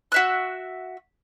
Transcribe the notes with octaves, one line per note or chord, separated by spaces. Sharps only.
F#4 E5 F#6